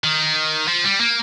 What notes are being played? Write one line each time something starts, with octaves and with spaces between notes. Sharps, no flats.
D#3
F3
G3
A#3